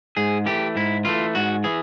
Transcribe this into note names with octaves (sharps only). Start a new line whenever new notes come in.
G#2 G#4
E3 A3 G4
G#2 E4
E3 A3 F4
G#2 F#4
E3 G#4